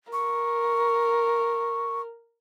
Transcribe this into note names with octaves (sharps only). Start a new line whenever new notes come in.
A#4 C#6